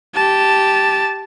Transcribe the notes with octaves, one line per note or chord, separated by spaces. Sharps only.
G4 A5